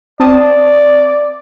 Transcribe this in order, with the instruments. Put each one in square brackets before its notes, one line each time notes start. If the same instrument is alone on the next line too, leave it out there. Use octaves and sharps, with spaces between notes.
[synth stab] C4 A5 D#6 [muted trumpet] D5